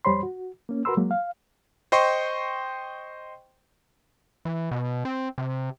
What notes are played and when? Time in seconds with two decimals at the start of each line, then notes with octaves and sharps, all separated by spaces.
0.05 F2 G3 C5 C#5 B5 C6
0.23 F#4
0.69 A#3 C#4
0.85 F#4 A#4 B4 B5 C6 E6
0.97 F#3 G#3 A#3
1.11 F5
1.92 C5 D#5 G5 C6 C#6
4.45 E3
4.71 B2
5.05 C4
5.38 C3